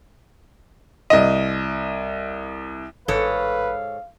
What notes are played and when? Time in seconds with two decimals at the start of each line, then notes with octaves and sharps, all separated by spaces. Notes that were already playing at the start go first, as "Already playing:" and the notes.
1.10 C2 D#5
3.08 A1 G#2 A4 B4 C#5 F5